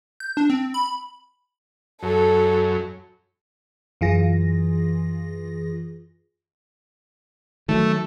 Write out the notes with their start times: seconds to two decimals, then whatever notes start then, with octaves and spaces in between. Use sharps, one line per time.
0.20 G6
0.37 D4
0.50 C4
0.74 B5
2.03 F#2 A4
4.01 F#2 E3 F4 G#4 A#6
7.69 D#3 E3 F#3 A3